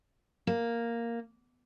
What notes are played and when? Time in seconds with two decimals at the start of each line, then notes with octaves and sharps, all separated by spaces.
0.47 A#3